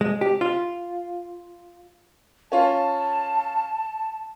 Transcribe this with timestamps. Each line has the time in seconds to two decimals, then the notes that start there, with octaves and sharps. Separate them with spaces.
0.01 G#3
0.21 G4
0.41 F4
2.52 C#4 F4 A5